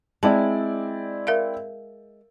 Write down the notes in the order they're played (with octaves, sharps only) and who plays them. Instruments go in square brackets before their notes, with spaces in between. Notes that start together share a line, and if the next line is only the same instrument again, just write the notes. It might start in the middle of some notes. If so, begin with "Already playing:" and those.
[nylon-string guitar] G#3 [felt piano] C4 E4 D5 [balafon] A5
[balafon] A#4 E5 F5